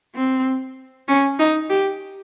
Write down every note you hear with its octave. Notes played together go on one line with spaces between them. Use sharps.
C4
C#4
D#4
G4